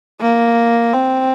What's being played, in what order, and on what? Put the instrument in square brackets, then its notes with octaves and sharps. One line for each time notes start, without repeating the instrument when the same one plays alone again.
[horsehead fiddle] A#3
C4